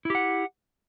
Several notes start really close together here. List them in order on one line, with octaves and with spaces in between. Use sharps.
E4 G4 F#5